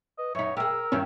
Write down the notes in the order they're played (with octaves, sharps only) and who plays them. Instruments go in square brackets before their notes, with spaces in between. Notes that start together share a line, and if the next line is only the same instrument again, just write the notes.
[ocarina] B4 [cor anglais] D#5
[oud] F#2 D#4 [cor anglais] C#5 [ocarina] E5
[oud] G4 G#4 [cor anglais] A#4 [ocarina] E6
[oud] G2 D#3 E4 [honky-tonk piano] C#4